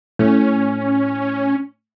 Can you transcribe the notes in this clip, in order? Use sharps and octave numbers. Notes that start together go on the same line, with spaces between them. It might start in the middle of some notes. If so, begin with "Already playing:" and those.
A2 C#4